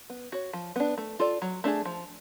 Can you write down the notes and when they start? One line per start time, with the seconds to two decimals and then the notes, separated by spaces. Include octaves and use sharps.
0.10 B3
0.32 F#4 C#5
0.53 F3
0.76 B3 D4
0.98 A3
1.19 F4 A4 D5
1.42 F#3
1.64 A3 D4 G#4
1.85 F3